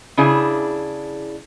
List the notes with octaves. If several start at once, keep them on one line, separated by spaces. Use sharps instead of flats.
C#3 D4 E4 G#4